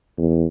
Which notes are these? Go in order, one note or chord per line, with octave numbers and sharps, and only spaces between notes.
E2